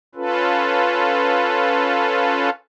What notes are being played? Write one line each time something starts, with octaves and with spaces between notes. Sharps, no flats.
C#4 F4 A4 B4